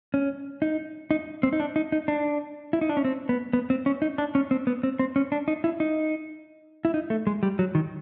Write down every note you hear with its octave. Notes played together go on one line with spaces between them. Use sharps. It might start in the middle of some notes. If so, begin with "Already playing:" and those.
C#4
D#4
D#4
C4
D#4
D4
D#4
D#4
D4
E4
D#4
D4
C#4
C4
B3
B3
C4
C#4
D#4
D4
C#4
C4
B3
C4
C4
C#4
D4
D#4
E4
D#4
E4
D#4
A3
G#3
G3
F#3
D#3